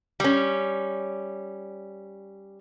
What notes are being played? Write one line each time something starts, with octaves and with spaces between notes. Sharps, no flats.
G3 C#4